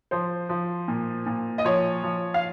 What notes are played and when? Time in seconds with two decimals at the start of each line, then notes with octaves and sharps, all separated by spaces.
0.11 F3 C5
0.49 F3
0.88 A#2
1.26 A#2
1.58 D#5
1.64 F3 C#5
2.03 F3
2.34 F5